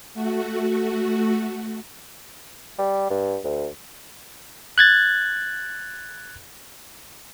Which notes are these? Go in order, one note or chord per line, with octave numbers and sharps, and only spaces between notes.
A3 F#4
G3
G2
D2
F#6 G#6 A6